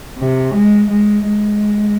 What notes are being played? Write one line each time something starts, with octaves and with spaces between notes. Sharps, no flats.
C3
G#3
G#3
G#3